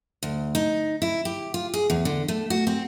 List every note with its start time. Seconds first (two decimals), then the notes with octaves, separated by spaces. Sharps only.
0.23 D2
0.55 D#4
1.02 E4
1.25 G4
1.54 F4
1.74 G#4
1.90 E2
2.05 D3
2.28 A3
2.50 F#4
2.67 C4